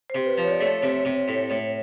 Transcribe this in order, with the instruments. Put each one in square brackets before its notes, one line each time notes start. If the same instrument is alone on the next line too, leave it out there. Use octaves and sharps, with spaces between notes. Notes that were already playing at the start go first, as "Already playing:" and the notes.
[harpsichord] C3 [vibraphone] C5
[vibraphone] B4
[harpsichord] F3
[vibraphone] C#5
D5
[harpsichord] A3 [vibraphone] C#5
[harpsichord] C3
C3
A2
A2